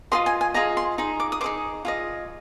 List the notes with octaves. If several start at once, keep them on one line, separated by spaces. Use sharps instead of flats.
F4 G#4 D#5 C6
G#5
G#5
F4 G#4 D#5 A#5
C6
D#4 G#4
D6
D#6
D#4 G#4 C5 D6
F4 G#4 D#5